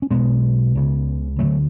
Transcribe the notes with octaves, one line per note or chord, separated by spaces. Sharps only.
C#4
B1 B2 G#3 B3
C#2 C#3
D2 D3 F#3 A3